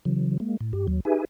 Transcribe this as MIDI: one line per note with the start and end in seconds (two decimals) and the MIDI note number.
0.05 0.38 49
0.05 0.38 52
0.05 0.38 54
0.40 0.57 56
0.40 0.57 58
0.60 0.73 45
0.73 0.87 43
0.73 0.87 67
0.87 1.00 39
0.87 1.00 54
1.05 1.25 63
1.05 1.25 67
1.05 1.25 68
1.05 1.25 71
1.05 1.25 76
1.05 1.25 80